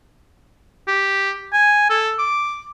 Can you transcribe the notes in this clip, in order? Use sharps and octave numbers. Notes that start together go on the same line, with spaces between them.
G4
G#5
A4
D6